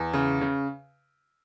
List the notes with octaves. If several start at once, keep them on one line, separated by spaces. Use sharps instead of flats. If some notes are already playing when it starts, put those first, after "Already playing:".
Already playing: E2
C#3
C#3